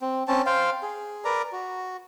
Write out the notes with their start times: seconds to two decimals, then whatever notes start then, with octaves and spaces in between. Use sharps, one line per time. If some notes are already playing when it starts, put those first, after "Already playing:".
0.01 C4
0.28 C4 C#4 A5
0.46 C5 F5 G5
0.83 G#4
1.24 A#4 B4 D5 A#5
1.52 F#4